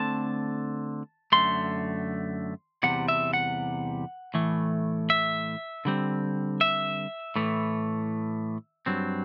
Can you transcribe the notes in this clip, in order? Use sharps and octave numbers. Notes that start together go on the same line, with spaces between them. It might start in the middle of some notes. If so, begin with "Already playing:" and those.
Already playing: D3 A3 C4 A5
F#2 D3 A3 C6
E2 C3 G3 F#5
E5
F#5
A2 E3 A3
E5
D3 G3 C4
E5
A2 E3 A3
G2 F#3 C4